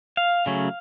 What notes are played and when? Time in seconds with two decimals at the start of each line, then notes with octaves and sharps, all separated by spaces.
0.17 F5
0.46 C#3 F#3 A3 C#4